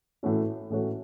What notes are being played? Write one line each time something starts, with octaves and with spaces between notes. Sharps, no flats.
A2 E3 A3 C#4 F#4
A2 E3 A3 C#4 F#4